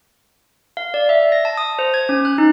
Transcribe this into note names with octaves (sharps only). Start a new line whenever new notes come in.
F5
D5
E5
A#6
A5
D#6
C5
G#6
C#4
F#6
D#4